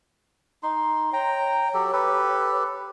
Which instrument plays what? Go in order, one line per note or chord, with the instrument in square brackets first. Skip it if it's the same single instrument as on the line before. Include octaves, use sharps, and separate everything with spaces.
[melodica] D#4 C6
[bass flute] C#5 [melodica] G5 A#5
[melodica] F#3 G4 A4
G4 A4 B4